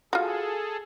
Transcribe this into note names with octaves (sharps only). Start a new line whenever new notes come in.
F4 F#4 G#4 A4